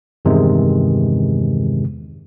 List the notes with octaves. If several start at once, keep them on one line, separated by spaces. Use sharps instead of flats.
E2 G2 C3 D#3 G#3